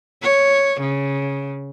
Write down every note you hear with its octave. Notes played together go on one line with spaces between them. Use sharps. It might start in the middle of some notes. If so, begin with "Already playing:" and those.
C#5
C#3